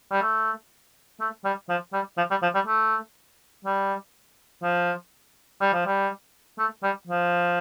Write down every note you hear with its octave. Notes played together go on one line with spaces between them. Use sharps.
G3
A3
A3
G3
F3
G3
F3
G3
F3
G3
A3
G3
F3
G3
F3
G3
A3
G3
F3